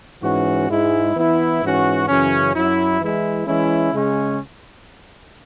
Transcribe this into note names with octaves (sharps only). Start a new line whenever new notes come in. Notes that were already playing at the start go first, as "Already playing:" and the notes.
G#2 E3 C#4 F#4
G#2 G#3 E4
E3 B3 E4
G#2 E3 C#4 F#4
F#2 C#3 E3 C#4
F#2 F#3 E4
E3 G#3 E4
E3 G#3 C#4 E4
C#3 G#3 C#4